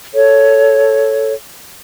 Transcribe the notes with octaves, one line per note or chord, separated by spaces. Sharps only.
A4 C#5